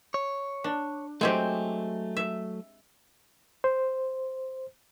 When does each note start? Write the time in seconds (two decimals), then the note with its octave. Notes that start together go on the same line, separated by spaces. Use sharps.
0.14 C#5
0.64 D4
1.21 F#3 G#3 A3 C4 G4
2.17 E5
3.64 C5